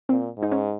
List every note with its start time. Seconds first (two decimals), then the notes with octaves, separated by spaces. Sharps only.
0.09 A#2 C4
0.37 G#2
0.43 D#4
0.52 C#4